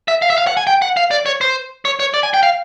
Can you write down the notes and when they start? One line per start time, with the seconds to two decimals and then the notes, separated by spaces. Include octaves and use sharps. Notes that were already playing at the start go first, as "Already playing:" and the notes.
0.08 E5
0.22 F5
0.30 E5
0.38 F5
0.47 F#5
0.57 G#5
0.67 G5
0.82 F#5
0.97 F5
1.11 D5
1.26 C#5
1.41 C5
1.85 C#5
2.00 C#5
2.14 D5
2.23 G#5
2.34 G5
2.43 F5